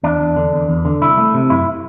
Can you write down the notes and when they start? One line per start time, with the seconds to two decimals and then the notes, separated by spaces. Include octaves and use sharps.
0.03 E2 D4
0.20 E2
0.36 D3
0.53 E2
0.69 E2
0.85 D3
1.01 C2 E4
1.18 A3
1.34 C3
1.50 F#2 E4